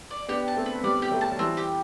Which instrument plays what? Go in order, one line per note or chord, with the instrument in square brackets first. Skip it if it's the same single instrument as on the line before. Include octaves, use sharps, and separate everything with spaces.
[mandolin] D5
[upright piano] B3 D4 [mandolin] G4
[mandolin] A5
[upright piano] A3 C4
[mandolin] B4
[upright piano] C4
[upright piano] G3 B3 [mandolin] D5
[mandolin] G4
[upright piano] F#3 A3
[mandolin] A5
[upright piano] F#3
[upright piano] E3 G3 [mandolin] C4
[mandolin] G4